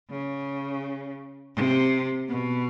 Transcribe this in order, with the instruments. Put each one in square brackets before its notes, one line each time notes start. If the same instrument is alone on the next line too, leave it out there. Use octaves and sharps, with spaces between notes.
[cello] C#3
C3
B2